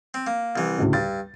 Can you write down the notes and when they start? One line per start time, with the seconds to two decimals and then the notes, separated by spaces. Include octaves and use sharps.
0.14 C4
0.27 A#3
0.56 C2 E3
0.78 D2 A2 C#3
0.93 G2 A6